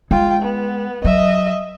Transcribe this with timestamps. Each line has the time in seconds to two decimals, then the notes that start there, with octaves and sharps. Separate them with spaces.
0.11 G#3 F4 G5
0.42 B3
1.04 F#3 D#5 E5